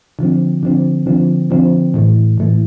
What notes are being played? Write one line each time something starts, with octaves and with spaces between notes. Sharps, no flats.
D3 F3 C4
D3 F3 C4
D3 F3 C4
D3 F3 C4
A2 E3 A3
A2 E3 A3